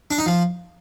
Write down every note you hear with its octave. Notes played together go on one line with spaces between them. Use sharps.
D4
D#4
F3